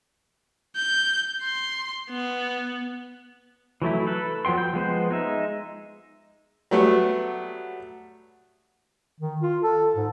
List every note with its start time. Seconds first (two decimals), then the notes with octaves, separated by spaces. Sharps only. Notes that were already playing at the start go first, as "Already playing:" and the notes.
0.76 G6
1.42 C6
2.10 B3
3.82 E3 F#3 A3 E4
4.07 A4 B4
4.45 F3 F#3 B3 G5 C6
4.58 G5
4.73 F3 G#3 B3 C5
5.11 G#3 D#4 E5
6.71 F#3 G3 A3 B3
9.20 D#3
9.42 F4
9.63 A4
9.96 G#2